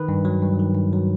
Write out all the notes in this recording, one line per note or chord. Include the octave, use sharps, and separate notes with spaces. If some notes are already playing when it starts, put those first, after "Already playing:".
Already playing: D#3 B4
G2
F#3
G2
D#3
G2
F#3